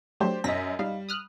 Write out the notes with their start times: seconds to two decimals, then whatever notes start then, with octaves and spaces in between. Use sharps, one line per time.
0.20 F#3 A3 D4 G4 C5
0.44 F#2 D#5 A#6 B6
0.79 G3 D#4 F5
1.09 D#6 F6 F#6